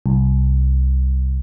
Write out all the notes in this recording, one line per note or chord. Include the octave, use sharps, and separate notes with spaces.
C2